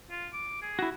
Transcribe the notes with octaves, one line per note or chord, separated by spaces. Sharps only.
F4
D6
G#4
E4 F#4